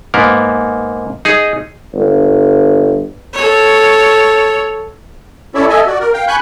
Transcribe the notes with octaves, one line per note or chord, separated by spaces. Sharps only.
G#2 A#3 B3 A#4
D#4 G#4
G1
A4 C#5
C#4 E4 A4 C#5 D5 E5
A4 D#5 E5 G#5
F#4 D5
A#4
F5 G5
G#5 B5 C#6 F#6 G6